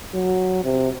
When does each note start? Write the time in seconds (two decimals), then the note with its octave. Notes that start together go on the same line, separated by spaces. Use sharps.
0.14 F#3
0.64 C3